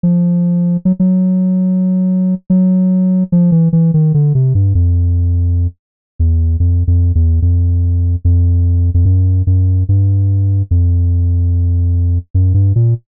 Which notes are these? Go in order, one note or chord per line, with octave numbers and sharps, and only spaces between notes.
F3
F#3
F#3
F#3
F3
E3
E3
D#3
D3
C3
G2
F2
E2
F2
F2
E2
F2
F2
F2
F#2
F#2
G2
F2
F#2
G2
A#2